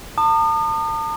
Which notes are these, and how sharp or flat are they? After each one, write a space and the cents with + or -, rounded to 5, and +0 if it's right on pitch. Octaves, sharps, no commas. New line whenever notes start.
A5 +40 D#6 -40